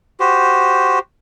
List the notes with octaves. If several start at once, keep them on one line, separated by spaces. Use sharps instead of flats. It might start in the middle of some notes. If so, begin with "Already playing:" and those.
F#4 G4 C5